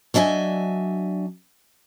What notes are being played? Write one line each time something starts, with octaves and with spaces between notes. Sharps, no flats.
F#3 D4 D#5 E5 G#5